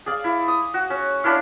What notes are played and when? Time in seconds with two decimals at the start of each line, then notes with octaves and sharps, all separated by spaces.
0.06 G#4 D5 F5
0.24 E4
0.48 D#6
0.74 F#4
0.90 C#4
1.24 C#4 D4 E4 F5